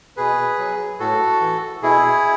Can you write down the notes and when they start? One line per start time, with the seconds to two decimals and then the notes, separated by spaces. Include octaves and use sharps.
0.17 B2 G#4 B4
0.58 F#3
0.99 A2 F#4 A4
1.41 E3
1.83 B2 E4 G#4